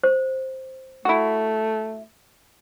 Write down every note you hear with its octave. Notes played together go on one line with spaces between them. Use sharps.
C5
A3 E4 F#4